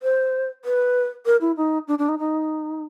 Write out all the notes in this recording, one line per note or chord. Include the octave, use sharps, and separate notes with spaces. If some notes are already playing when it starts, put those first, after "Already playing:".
C5
B4
A#4
E4
D#4
D4
D4
D#4
D#4